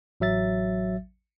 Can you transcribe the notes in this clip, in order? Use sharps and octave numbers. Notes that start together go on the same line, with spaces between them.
A1 F#3 E5 A6